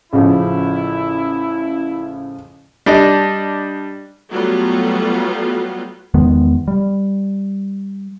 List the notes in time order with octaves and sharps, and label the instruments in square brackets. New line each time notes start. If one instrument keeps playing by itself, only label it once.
[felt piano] A1 C#3 F3 [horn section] E4
[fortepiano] G3 D4 D#5
[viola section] F#3 G3 A3 B3 F4 F#4
[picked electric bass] E2 D#3 G#3 B3
G3